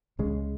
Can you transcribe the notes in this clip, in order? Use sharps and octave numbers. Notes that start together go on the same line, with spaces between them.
C#2 C#3 G#3